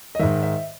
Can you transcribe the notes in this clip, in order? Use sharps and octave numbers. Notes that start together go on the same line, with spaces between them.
D#5
G#2 D#3 E5
E5